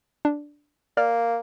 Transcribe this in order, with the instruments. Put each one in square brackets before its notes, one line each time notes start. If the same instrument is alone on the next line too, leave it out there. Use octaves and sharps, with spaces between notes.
[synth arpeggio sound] D4
[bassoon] A#3 [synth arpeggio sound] D5 F6